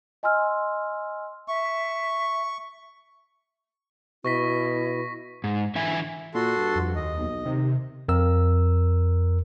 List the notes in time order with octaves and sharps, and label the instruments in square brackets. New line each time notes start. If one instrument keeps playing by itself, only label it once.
[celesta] D#5 G#5 C6 E6 F6
[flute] E5 [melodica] C#6
[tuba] B2 [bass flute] E4 [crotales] C#6 A#6 B6
[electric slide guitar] G#2
D3 E3 E5 G#5
[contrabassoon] A#2 [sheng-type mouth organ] F#4 A4 C6
[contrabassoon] G2
[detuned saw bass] F2
[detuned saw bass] D#2 [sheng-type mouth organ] D#5
[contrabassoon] B1
[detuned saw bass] C3 [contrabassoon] D#3
[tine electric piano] F2 A#4 E6